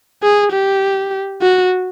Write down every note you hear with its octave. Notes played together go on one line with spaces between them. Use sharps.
G#4
G4
F#4